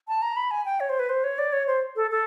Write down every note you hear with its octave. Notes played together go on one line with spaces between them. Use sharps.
A5
A#5
B5
G#5
G5
C#5
C5
B4
C5
C#5
D5
C#5
C5
A4
A4